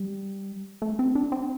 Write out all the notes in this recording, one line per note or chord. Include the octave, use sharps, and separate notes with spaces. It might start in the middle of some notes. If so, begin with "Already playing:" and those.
Already playing: G3
A3
C4
D4
C4